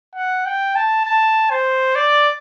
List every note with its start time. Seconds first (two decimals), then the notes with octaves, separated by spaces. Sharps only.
0.16 F#5
0.46 G5
0.76 A5
1.05 A5
1.50 C5
1.96 D5